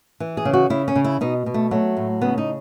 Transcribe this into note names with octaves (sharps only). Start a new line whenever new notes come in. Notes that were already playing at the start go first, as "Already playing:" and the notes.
E3
G#4
C#3
F#4
C#3 E4
C#4
C#3
E4
B2 D#4
B2
A3
F#3 A3
A2
C#3 B3
D#4